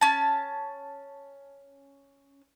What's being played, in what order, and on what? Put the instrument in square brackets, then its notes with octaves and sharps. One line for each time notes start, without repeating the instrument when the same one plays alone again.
[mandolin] C#4 A5